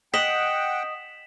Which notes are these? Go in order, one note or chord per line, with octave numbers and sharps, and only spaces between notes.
D#5 F#5 G5 B6 E7 F#7